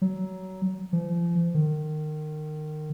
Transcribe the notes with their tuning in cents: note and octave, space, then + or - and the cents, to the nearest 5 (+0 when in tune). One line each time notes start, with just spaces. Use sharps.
F#3 +20
F3 -35
D#3 -25